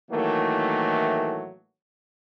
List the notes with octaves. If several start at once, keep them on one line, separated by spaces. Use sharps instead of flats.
A2 D#3 E3 F#3 A3 A#3